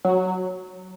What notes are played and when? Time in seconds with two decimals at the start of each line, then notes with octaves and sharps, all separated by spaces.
0.05 F#3